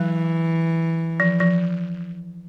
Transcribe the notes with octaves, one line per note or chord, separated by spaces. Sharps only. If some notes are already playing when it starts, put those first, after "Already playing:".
Already playing: E3 F#3
F3
F3